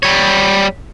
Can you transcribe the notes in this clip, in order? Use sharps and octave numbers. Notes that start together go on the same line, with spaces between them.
G3 C#5